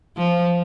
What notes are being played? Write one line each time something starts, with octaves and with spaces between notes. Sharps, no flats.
F3